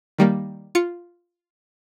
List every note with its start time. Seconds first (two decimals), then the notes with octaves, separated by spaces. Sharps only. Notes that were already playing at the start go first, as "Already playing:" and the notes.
0.18 D#3 G3 A#3
0.75 F4 C#7